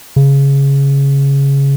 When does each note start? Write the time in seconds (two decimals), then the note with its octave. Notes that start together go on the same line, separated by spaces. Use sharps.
0.16 C#3